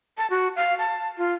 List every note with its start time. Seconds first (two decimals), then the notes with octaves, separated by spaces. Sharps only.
0.18 A5
0.30 F#4
0.56 F5
0.79 A5
1.18 F4